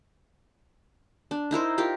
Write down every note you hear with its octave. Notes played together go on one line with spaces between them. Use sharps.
D4
D#4 E4 A#4 C5
F4 G4 A#4